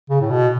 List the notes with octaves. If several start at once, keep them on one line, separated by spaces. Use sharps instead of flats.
C#3
A2
B2